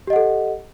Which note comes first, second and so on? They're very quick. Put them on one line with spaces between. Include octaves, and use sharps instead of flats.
G4 D#5 F#5 A4